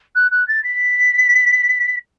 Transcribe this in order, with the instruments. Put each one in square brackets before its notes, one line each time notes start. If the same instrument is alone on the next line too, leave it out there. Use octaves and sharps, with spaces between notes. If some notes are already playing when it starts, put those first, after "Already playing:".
[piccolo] F#6
F#6
A6
B6